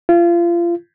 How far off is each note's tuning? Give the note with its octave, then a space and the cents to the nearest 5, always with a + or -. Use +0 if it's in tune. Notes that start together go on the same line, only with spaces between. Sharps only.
F4 -30